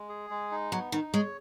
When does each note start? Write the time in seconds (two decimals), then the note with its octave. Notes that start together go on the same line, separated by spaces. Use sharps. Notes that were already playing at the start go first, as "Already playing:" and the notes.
Already playing: G#3
0.09 G#4
0.30 G#3
0.52 D#4
0.72 F#3 B3
0.92 D#3 D#4
1.13 G#3 C#5